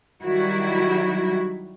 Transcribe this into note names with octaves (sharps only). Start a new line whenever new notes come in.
D#3 F#3 G3 E4 F#4